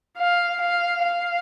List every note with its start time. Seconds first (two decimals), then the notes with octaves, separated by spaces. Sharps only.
0.18 F5
0.60 F5
1.03 F5